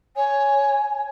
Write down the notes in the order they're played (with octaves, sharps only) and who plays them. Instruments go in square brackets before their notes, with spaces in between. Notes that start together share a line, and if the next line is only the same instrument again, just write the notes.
[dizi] C#5 [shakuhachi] G#5